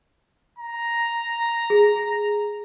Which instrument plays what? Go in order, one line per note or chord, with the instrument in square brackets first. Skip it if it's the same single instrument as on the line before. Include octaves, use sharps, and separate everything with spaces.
[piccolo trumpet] A#5
[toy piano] G#4